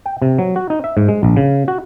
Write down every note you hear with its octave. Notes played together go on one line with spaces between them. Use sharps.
G5
C3
F#3
F#4
D#4
E5
G#2
G#3
A#1
C#3
F#4